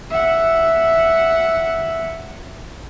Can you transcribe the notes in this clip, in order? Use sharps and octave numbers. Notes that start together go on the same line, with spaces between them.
E5 F#5